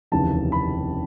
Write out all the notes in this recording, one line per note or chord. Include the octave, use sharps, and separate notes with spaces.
F1 D#2 C#3 E3 A5
B5